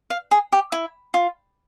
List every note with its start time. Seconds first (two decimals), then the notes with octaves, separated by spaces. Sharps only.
0.10 F5
0.31 G#4
0.52 G4
0.72 E4
1.14 F4